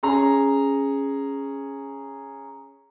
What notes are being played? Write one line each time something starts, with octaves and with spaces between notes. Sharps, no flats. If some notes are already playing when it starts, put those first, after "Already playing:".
C#4 G#4 A#5